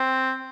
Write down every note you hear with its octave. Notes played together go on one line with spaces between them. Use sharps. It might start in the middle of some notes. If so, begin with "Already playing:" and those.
Already playing: C4